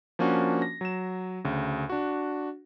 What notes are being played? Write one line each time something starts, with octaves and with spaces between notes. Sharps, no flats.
F3 A#3 C#4 D4 F#4
A#6
F#3 E7
D2 C#3
D4 F#4